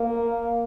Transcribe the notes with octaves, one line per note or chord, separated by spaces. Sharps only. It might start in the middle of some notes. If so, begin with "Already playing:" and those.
Already playing: A#3